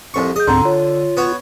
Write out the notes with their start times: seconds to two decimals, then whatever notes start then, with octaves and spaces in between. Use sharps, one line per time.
0.14 C2 F2 C#6
0.36 G#4 D#5 G6
0.47 C#2 G#2 D3 C4 A#5 C6
0.65 F4 C#5
1.17 B3 F#4 C#5